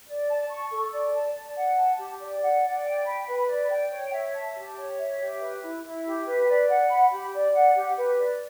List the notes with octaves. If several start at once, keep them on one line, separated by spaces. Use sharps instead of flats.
D5
A5
C#6
A4
D5
A5
D5
F#5
A5
G4
D5
F#5
D5
G5
B5
B4
D5
G5
C#5
E5
A5
G4
C#5
E5
G4
B4
E4
E4
G4
B4
D5
F#5
B5
G4
D5
F#5
G4
B4
D5